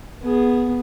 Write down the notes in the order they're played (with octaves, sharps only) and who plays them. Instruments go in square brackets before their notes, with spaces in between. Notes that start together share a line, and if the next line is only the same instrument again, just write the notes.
[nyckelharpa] B3 G#4